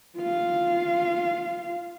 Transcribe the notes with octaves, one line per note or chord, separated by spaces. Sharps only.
F4 F5